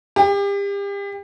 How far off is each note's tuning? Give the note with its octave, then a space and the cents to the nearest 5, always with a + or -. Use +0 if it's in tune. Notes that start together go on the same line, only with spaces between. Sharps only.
G4 +35